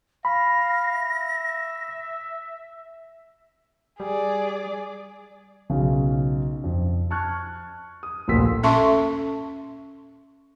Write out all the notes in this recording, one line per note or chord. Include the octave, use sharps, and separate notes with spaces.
F5 B5 A#6
E5
G3 G#4 D5
B1 C#3
F2
A5 C#6 F6 F#6 G#6
D#6
D#1 A#1 A3 C6 E6 B6
C#4 A4 E5 A5 C6 C#6